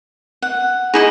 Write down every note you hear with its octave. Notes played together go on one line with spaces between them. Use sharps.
F#5
D#4 E4 G#4 D#5